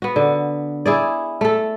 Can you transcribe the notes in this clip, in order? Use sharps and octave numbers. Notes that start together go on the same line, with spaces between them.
B3 F#4
D3
E4 G#4 D5
A3 A4